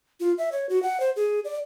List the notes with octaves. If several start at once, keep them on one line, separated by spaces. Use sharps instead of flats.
F4
E5
C#5
F#4
F#5
C5
G#4
D5